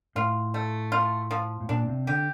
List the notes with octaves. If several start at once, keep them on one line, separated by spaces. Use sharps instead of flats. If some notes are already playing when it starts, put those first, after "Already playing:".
A2 F4
A3
F4
F3
A2
A#2 D4
C3
D3 G4